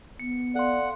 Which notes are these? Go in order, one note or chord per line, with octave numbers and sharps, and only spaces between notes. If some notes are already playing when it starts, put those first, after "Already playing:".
B3 C#7
A4 D5 F5 F#5 C6